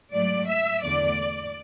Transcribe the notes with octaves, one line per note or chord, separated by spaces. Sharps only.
G#2 F#3 A3 D5
E5
E2 D3 A3 D5